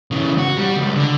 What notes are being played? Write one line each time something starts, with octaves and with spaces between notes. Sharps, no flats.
C#3 E3
F#4
G3
C#2
D3